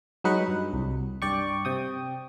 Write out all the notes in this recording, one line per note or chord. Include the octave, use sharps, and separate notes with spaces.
F#3 G#3 D#4 B4 F#5
G2
C2
G2 D5 G5 C#6
C3 G5 D#6